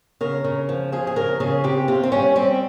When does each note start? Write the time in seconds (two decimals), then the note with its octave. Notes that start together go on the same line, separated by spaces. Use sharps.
0.21 C#3 A#4
0.44 C#3
0.69 F3
0.92 F3 G#4
1.07 G#4
1.16 C#3 A#4
1.40 C#3 G#4
1.64 C3 G4
1.88 C3 F4
2.03 C4
2.12 G3 C#4
2.36 G3 C4